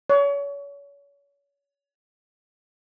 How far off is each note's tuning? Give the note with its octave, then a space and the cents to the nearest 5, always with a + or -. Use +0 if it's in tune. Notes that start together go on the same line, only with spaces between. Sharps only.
C#5 +35